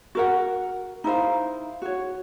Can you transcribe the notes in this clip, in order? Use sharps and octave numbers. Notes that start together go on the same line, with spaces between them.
F#4 A#4 F#5
D#4 E4 C5 F5
F#4 C#5